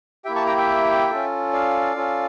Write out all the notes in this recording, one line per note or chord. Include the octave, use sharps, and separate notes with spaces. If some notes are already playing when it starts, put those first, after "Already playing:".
A#3 E4 G4 E5 G5
A5 C#6
G5 A#5
E5 G5
C#4 F4 A4
D5 F5
C#4 F4 A4